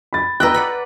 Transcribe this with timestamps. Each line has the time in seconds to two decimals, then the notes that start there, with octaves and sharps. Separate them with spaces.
0.13 B5 A6
0.40 B4 D#5 G5 A#5 E6 F#6
0.54 D5 F#5 B5